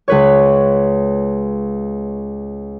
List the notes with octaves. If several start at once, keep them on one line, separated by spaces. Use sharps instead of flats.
C#2 B4 C#5